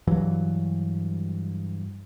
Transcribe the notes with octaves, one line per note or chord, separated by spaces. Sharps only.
G2 E3 F#3